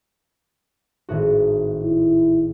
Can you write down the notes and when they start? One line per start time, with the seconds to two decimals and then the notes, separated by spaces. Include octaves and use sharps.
1.09 G#1 A2 F#4
1.83 E4